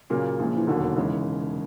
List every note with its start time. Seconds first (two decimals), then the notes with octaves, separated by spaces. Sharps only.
0.10 A#2 C#3 F#3 A#3
0.39 A#1 A#2 F3
0.56 E3
0.67 E1 D#2 D3 D#3 F#3
0.96 C#3 E3 G#3